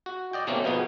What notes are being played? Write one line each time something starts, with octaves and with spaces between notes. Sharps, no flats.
F#4
D5 D#5 G5
B2 D#3 A3 A#3 C4 C#4
B2 F3 B3 D#4 G#4